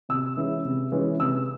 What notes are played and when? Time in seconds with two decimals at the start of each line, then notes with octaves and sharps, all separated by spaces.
0.09 C3 E6
0.37 E3 G#3 C#4 E4
0.65 C3
0.92 E3 G#3 C#4 E4
1.20 C3 E6